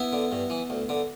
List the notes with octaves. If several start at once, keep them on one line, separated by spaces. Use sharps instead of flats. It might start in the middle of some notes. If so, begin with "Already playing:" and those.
Already playing: B3 E4
D3
G2
E3
D2
D3